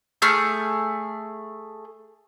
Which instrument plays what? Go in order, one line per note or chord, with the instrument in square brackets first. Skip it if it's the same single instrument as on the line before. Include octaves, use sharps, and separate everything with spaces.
[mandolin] A3 G#4 F6 G6